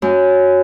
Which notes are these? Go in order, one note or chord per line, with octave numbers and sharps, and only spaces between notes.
F#2